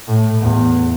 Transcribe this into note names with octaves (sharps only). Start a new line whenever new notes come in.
A2
E2